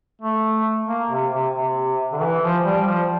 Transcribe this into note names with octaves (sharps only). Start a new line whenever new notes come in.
A3
A#3
C3
C3
C3
D3
E3
F3
G3
F3